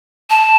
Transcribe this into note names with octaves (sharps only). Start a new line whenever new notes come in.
A5